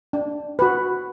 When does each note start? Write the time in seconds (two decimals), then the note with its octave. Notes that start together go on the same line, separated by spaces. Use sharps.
0.13 D4
0.59 F#4 B4